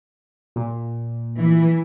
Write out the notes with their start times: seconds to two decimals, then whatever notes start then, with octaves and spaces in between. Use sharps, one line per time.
0.56 A#2
1.40 E3